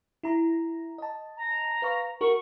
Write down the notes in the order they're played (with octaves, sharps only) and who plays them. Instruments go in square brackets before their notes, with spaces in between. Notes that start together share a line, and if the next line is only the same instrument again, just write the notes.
[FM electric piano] E4 A#5
D#5 A5
[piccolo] A#5
[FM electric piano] B4 F5 C#6
[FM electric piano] F#4 A#4 [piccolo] C#6